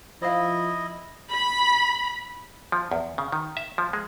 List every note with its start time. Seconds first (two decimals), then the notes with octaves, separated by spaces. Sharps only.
0.22 F3 E4 C5 D#5 F5
1.31 B5
2.72 F3
2.91 E2
3.18 C#3
3.32 D#3
3.57 E5
3.78 F3
3.93 G#3